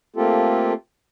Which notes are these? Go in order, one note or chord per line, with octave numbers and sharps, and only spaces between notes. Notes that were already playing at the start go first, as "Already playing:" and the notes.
A3 A#3 C4 F4 G4 A4